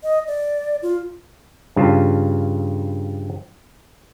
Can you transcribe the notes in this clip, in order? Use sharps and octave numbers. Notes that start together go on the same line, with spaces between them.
D#5
D5
F4
G2 C#3 F4 A5